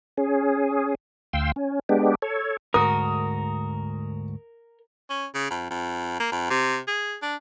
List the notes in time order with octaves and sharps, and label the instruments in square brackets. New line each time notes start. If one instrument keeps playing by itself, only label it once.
[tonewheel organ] C#4 G#4
D2 F5 G5 C6 E6
C#4
G#3 B3 D4 G4
A4 C#5
[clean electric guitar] D2 G#2 F#4 [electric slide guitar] A#4 [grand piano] D#6
[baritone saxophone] C#4
C#3
F2
F2
A#3
F2
C3
G#4
D4